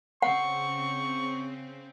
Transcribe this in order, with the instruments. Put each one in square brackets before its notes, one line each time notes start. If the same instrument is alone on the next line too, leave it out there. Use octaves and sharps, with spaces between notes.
[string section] C#3 C4 [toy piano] F#5 [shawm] C#6